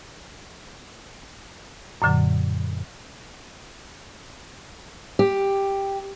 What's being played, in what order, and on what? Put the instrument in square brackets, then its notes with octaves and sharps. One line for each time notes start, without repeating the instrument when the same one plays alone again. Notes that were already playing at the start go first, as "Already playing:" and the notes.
[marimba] F#2 A#2 D3 F#3
[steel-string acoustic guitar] G4